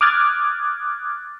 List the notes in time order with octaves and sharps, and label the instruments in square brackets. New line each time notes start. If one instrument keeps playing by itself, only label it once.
[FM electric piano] D6 D#6 F6 F#6 G#6 A6